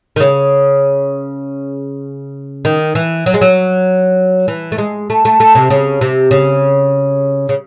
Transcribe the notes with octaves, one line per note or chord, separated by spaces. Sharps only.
D#3
C#3
D#3
E3
F#3
G#3
F#3
E3
A3
G#3
A3
A3
A3
C3
C#3
C3
C#3
C#3